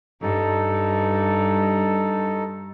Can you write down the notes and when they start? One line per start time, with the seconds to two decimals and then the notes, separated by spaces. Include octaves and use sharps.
0.22 G2 D#4 A4